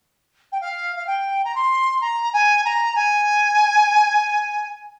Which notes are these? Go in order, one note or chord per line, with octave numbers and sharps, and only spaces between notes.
G5
F5
F5
G5
A#5
C6
A#5
G#5
A#5
G#5